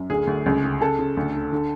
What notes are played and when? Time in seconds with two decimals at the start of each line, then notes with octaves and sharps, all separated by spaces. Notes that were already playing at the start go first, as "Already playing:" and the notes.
Already playing: F#2
0.10 D2 G#4
0.27 D2
0.46 C#2
0.64 C#3
0.81 C#3 A4
0.99 C#3
1.17 D2
1.34 D3
1.52 D3